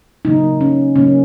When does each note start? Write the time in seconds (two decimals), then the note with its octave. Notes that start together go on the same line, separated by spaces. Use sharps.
0.25 C#3 F#3 A#3 D#4
0.61 C#4
0.96 C#3 F#3 A#3 C#4